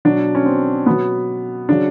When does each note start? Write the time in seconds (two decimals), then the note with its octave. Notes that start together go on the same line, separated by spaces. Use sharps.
0.05 B2 F#3 D4
0.35 C#4
0.46 C4
0.86 B2 F#3 B3
1.69 C#3 F#3 D4